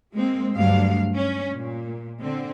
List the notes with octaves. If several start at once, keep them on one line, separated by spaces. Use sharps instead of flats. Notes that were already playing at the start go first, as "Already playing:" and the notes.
G#3 A#3 C4
D2 G2 F#3 D4 F5
C#4
A#2
D3 C4